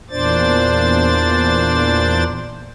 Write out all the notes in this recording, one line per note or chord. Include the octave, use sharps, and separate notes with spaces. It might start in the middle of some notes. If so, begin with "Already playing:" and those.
E2 A#2 D4 C5 D5 A6